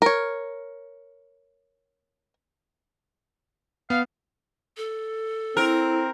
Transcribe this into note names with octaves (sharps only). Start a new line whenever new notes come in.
A#4 C#5
B3 F5
A4
C4 E4 A#4